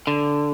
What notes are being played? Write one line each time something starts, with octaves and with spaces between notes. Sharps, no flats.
D3